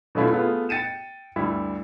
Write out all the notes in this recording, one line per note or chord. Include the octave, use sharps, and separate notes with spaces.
B2 F#3 A3 C#4 E4 F4
A3 B3 F4 G#4
G5 A6 C#7 D#7 E7
D2 G2 G3 E4